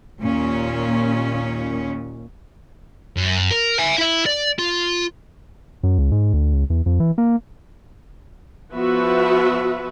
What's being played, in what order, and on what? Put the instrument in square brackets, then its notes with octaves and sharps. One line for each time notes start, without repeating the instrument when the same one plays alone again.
[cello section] D#2 A#2 C#4
[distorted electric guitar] F#2
A#4
E5 G#5
E4
D5
F4
[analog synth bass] F#2
C#2
G#2
D2
C#2
E2
F2
E3
A#3
[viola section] F3 B3 F#4 B4 E5